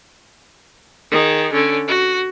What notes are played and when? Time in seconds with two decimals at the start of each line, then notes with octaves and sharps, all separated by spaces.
1.11 D#3 G#4
1.53 D3 C#4
1.88 F#4